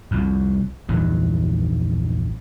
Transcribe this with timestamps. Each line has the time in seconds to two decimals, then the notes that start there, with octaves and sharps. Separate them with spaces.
0.11 C2 F2
0.89 A#1 E2 G2 D#3